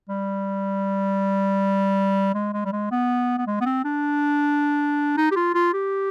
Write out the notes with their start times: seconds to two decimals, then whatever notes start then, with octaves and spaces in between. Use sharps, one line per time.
0.09 G3
2.34 G#3
2.53 G#3
2.65 G3
2.73 G#3
2.91 B3
3.38 B3
3.47 G#3
3.61 B3
3.66 C4
3.84 D4
5.17 D#4
5.31 G4
5.36 F4
5.55 F4
5.73 G4